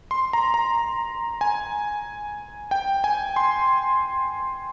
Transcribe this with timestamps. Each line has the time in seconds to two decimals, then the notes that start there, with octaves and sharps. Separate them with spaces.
0.11 C6
0.33 A#5
0.54 A#5
1.41 G#5
2.71 G5
3.04 G#5
3.36 C6